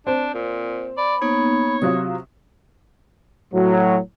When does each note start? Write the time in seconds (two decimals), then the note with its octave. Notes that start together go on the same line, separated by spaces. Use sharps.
0.07 C4 D4
0.34 A#2
0.98 D5 B5
1.22 A#3 B3 D#4 C#5
1.82 C3 F#3 F4 D#6
3.53 A2 F#3